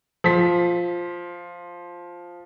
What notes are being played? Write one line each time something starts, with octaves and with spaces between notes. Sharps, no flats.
F3 B6